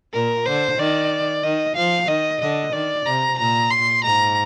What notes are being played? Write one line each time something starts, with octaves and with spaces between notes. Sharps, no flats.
A#2 A#4
D3 C5
D#3 D5
D#3 D#5
F3 F5
D#3 D#5
D3 D#5
D#3 D5
C3 A#5
A#2 A#5
C6
G#2 A#5